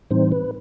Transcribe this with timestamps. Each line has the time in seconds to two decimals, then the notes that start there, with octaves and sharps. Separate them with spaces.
0.10 A2 E3 G3 C4 D#4 C5
0.32 B4